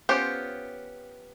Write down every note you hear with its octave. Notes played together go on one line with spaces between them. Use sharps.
B3 C#4 F4 G4 C5